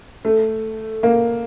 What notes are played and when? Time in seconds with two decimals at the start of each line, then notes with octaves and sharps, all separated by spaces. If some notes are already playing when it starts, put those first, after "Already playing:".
0.25 A3
1.03 A#3